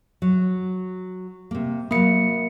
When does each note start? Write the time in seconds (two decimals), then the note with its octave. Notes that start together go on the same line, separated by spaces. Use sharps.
0.22 F#3
1.51 C3 A#3
1.91 F#3 A#3 F5 C#7